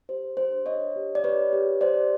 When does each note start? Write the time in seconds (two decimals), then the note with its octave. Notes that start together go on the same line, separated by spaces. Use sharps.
0.09 G4 C5
0.37 D4 C5
0.66 D4 C#5 D#5
0.96 G4
1.15 D5
1.23 G4 B4 C#5
1.53 G4
1.81 G4 C5 D5